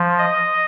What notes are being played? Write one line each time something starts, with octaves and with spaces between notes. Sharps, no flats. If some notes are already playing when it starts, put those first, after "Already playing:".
Already playing: F3
D#5